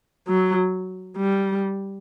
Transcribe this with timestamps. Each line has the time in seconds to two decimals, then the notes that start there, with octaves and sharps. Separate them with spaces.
0.28 F#3
1.17 G3